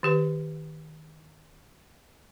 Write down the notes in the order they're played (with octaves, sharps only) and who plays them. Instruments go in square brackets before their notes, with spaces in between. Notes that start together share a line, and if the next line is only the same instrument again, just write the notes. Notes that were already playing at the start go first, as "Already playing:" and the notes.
[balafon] D#3 G4 B4